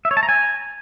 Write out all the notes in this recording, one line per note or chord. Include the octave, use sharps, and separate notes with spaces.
E5
C#5
A5
A#5
G#5